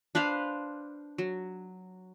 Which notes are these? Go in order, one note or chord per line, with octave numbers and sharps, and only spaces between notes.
D4 B4 C5 F5
F#3